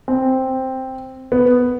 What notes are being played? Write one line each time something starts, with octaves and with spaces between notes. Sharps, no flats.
C4
B3